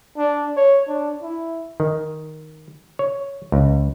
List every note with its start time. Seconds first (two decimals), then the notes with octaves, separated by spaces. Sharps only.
0.18 D4
0.57 C#5
0.88 D4
1.23 E4
1.80 D#3
2.99 C#5
3.52 C#2